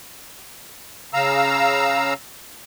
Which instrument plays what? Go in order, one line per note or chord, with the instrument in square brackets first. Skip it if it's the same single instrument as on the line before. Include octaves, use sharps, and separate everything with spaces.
[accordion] C#3 F5 A#5 E6